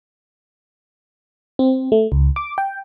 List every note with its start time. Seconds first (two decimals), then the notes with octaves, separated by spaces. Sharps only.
1.59 C4
1.92 A3
2.12 C#2
2.36 D6
2.58 G5